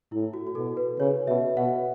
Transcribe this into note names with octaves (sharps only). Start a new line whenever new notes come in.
A2 E4
F#4
F#4
B2 A4
B4
C#3 C#5
B2 E5
B2 F#5